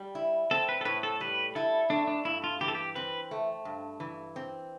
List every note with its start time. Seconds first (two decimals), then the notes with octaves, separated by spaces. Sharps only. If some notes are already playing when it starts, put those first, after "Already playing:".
Already playing: G3
0.15 E4
0.51 C4 A4
0.69 B4
0.81 A4
0.85 A2 B4
1.03 A4
1.20 G3 B4
1.55 E4 A4
1.90 A3 D4
2.07 D4
2.25 G2 E4
2.44 F4
2.61 E3 G4
2.68 A4
2.75 G4
2.95 C4 B4
3.31 A3
3.65 G2
4.00 E3
4.36 C4